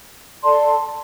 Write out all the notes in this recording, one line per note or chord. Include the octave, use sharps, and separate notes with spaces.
A4 D5 A5 C6